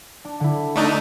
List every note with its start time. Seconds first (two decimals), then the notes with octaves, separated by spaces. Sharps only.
0.25 D4
0.40 D3 E4
0.76 A3 D4 D#4